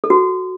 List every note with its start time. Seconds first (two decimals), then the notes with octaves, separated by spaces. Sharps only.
0.04 A4
0.10 F#4